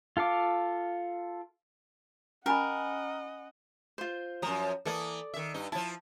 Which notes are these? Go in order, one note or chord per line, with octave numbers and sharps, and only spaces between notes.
F4 A4 F5 D6
C#4 A#4 D#5 F#5 G#5 B5
F4 C5
F#2 F3 A#5 D#6
E3 A#3 A4 D5 D#6
D#3 E5
G2 D#4
F3 E4 A5